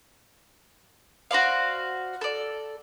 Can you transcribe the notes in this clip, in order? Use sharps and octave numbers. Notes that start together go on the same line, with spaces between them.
F#4 C5 D5 F5
A4 D5